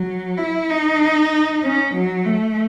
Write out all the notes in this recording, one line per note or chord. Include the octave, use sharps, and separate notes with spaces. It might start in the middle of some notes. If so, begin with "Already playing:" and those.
Already playing: F#3
E4
D#4
C#4
F#3
A3